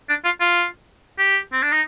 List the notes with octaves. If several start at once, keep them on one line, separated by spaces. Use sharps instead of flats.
D4
F4
F4
G4
C4
D4
D#4